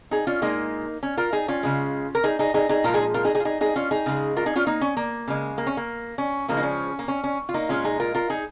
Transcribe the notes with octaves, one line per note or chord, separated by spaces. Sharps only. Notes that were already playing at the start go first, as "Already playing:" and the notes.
D#4 G#4
C#4 F4
A#2 G#3 A#3 D#4
C#4
F4 A#4
D#4 G#4
C#4 F4
C#3 G#3
A#4
D#4 G#4
D#4 G#4
D#4 G#4
D#4 G#4
A#2 F3 G#3 F4 A#4
D#4 G#4
F4 A#4
D#4 G#4
D#4 G#4
F4
D#4 G#4
D#4 G#4
C#4 F4
D#4 G#4
C#3 G#3
F4 A#4
D#4 G#4
C#4 F4
A#3 D#4
C#4
A#3
C#3 G#3
A#3
C#4
A#3
C#4
C#3 F3 G#3 A#3
D#4
C#4
A#3
C#4
C#4
F4
A#3 D#4
A#2 G#3 C#4 F4
D#4 G#4
F4 A#4
F4 A#4
D#4 G#4